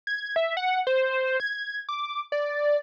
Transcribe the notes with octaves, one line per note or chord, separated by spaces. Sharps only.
G#6
E5
F#5
C5
G#6
D6
D5